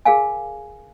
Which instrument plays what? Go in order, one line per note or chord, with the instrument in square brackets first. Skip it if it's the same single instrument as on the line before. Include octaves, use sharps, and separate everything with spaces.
[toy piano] G#4 A#4 F5 G#5